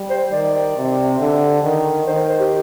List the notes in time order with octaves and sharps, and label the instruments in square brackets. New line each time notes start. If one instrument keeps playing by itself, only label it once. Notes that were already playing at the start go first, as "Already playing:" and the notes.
Already playing: [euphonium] G3
[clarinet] C5
[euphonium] D#3 [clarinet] D5
[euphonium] C3
D3
D#3
[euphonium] D#3 [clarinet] C5
[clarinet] C5
G4